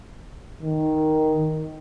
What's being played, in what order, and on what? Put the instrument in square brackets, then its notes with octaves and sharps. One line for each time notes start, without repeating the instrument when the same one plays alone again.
[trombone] D#3